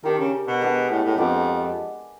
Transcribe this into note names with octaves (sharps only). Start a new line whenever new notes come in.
D#3 D4 G4 A#4
C#3
B2
G#3 B3 D4 G4
A2
A2
F2 G#3 B3 D4 G4